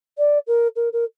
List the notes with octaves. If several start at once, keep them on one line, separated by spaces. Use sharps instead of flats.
D5
A#4
A#4
A#4